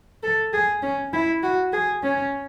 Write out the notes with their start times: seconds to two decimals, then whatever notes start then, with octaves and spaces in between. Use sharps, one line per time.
0.23 A4
0.53 G#4
0.82 C#4
1.13 E4
1.43 F#4
1.73 G#4
2.03 C#4